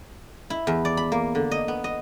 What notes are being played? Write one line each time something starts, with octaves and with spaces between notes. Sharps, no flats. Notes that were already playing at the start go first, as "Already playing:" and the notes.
E4
E2
D5
B5
A#3
D3
D#5
B3
D#5